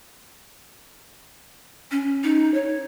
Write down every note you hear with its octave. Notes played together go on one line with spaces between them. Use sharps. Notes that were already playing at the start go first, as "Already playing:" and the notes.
C#4
D#4
C#5